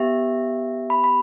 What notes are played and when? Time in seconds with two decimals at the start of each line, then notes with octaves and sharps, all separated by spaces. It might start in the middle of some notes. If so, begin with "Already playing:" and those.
Already playing: B3 G4 E5
0.90 B5
1.04 B5